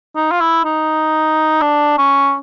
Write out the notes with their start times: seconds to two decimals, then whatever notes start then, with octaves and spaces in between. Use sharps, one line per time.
0.16 D#4
0.31 F4
0.41 E4
0.65 D#4
1.61 D4
1.98 C#4